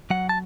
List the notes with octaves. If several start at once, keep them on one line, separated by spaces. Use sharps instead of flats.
F#3 F#5
A5